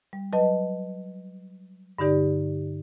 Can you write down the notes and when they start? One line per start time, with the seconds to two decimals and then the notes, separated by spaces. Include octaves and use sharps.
0.13 G3
0.33 F#3 B4 D#5 A5
1.99 G2 D3 D#4 G4 D5